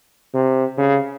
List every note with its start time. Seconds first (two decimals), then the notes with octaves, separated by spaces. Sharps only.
0.34 C3
0.78 C#3